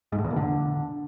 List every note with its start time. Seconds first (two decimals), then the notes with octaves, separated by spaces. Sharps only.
0.12 G#2
0.18 A2
0.24 E2
0.30 A#2
0.36 D3